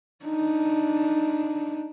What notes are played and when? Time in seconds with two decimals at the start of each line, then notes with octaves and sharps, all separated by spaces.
0.24 D4 D#4